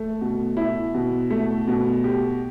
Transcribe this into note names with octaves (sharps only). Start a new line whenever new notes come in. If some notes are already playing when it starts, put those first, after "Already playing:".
Already playing: A3
B2
E4
B2
A3
B2
G4